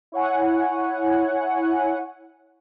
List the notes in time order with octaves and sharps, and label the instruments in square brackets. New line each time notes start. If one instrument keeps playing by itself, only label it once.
[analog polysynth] E4 C#5 F#5 G#5